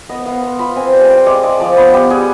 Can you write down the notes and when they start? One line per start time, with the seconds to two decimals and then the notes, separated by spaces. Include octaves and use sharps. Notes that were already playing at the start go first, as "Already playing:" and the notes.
0.09 B3 D#5
0.25 B3 F5
0.42 B3 C6
0.59 F4 B5
0.76 C4 G#5
0.93 G3
1.01 G#5
1.10 F4 G5
1.26 G#3 D5
1.43 G#3 D5
1.60 F3 D5
1.77 B3 B4
1.93 B3 G4
2.10 G3 G#4